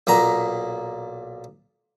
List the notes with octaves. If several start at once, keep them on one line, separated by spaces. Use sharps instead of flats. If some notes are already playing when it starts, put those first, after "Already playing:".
B1 A#2 A#5